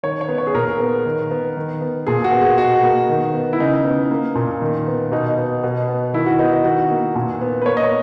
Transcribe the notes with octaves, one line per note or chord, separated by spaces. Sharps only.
D#3 C#5
C#5
B3
C#5
G#4
A#2 A#4
B3
D#3
B3
D#3
B3
A#2 G#4
F#4
B3
G#4
B2 F#4
A#3
D#3
B3
E4
C#3 D#4
B3
A#3
A#2
D#3
B3
B2 D#4
B3
B2
B3
D#3 E4
F#4
B3 D#4
D#4
D#3 F#4
A#3
A#2
B3
B4
A#3 C#5
D#5
C#5